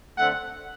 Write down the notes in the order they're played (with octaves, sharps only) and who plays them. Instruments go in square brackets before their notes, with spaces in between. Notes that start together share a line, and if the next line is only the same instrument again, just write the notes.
[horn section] D3 A3 C4 F#5